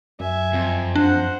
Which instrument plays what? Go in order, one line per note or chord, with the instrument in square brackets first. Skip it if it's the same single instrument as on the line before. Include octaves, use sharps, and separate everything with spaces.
[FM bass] F#2 [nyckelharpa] E5 G#5
[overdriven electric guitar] F2
[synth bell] D4 [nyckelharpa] C5 F#5